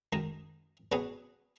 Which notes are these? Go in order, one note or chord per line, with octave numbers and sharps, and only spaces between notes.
F#2 D#3 G#3 D#4
B2 F#3 C#4 G#4 B4